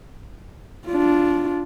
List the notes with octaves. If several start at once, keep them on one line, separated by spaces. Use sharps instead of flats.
D4 F4